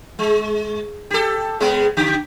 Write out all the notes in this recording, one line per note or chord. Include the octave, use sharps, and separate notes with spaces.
G#3
G4 A4
C#3 G#3 B3
D3 G4